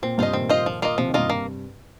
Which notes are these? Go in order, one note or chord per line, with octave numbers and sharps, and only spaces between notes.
A#2 C4
G2 C3 F4 C5 D#5
A#2 D#3 C4
F4 C5 D#5
F3
A#3 F4 D#5
C3 F3
D#3
G2 C3 A#3 F4 D#5
A#3